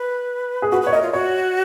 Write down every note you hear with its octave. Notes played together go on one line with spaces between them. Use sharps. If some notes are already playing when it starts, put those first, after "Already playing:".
Already playing: B4
G#4
F#4 B4
B4
C#5
A#4 D#5
F4
F#4 C#5